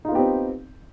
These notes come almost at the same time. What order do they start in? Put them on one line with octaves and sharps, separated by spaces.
D#4 F4 B3 G4 C4